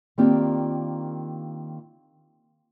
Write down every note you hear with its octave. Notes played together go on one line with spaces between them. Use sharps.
D#3 A#3 C4 D4 F4 G4